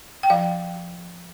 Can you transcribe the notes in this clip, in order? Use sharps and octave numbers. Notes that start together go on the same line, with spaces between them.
G5
F3 F5